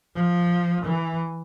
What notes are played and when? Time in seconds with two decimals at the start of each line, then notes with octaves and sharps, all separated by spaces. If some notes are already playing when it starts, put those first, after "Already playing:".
0.15 F3
0.85 E3